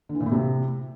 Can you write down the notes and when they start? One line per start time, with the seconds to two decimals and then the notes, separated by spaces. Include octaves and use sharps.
0.09 D3
0.15 E3
0.20 A#2
0.26 A2
0.32 C3